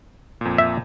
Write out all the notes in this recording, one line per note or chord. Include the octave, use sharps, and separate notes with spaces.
F2 A#2
E5